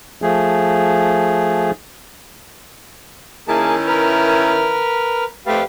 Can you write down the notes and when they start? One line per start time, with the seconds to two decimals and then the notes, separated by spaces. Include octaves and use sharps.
0.22 F3 A3 G#4
3.48 D#3 A#3 C#4 E4 G#4 A5
3.87 A#4 B4 F6
5.46 F2 A3 G4 B4 F5